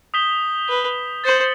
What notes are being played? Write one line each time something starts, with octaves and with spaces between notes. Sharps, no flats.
D#6 G6 B6 E7 G7
B4
C5 A6 C#7 F#7